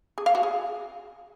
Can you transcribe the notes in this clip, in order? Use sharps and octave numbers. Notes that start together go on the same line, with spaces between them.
G#4
F5
F#4
G#4